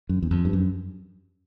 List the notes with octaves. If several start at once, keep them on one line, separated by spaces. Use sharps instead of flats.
F#2
E2
F2
G2
F#2